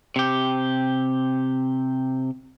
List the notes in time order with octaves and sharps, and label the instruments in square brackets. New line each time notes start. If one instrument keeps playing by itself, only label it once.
[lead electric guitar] C3 G4